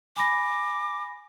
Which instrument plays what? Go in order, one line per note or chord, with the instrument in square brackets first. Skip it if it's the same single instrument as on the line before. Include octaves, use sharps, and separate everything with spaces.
[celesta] G#5 B5 A#6 [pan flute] D6